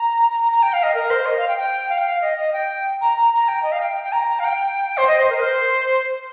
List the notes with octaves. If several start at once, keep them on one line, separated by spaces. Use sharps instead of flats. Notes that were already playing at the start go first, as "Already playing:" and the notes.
Already playing: A#5
A#5
A#5
A#5
G5
F5
D#5
A#4
C5
D#5
F5
G5
G5
F5
G5
F5
D#5
D#5
G5
A#5
A#5
A#5
G5
D#5
F5
G5
G5
A#5
F5
G5
C5
D#5
C5
A#4
C5